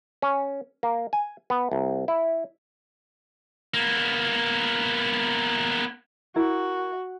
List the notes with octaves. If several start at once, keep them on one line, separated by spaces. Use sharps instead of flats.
C#4
A#3
G#5
B3
C2
E4
A#3 B3
E4 F#4 A#4